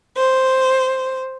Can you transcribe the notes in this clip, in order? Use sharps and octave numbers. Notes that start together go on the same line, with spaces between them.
C5